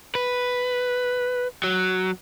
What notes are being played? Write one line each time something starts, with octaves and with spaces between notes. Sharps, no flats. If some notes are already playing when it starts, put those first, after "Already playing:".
B4
F#3